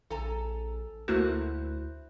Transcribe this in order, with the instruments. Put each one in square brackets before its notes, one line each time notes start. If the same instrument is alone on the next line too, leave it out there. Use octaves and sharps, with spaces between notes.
[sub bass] A#1 [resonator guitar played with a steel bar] A4 G#5 A#5
[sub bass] D2 [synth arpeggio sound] A3 A#3 F#4 [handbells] E4 F#6 [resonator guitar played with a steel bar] C5